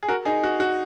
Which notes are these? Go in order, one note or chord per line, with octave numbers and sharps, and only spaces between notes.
G#4
F#4 A#4
D#4 G#4
F#4
F#4